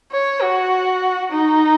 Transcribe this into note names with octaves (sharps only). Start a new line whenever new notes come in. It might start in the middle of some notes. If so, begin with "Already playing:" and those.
C#5
F#4
D#4